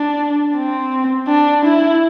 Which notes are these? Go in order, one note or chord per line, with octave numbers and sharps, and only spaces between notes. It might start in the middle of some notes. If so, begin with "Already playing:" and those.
Already playing: D4
C4
D4
E4